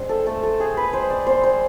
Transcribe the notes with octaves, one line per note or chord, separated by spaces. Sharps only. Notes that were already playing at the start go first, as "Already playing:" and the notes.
Already playing: G#3 C4 D4 C5
A4
A3 A4
A4
C4 G#4
B4
G#3 C5
D5
C4 C5
C5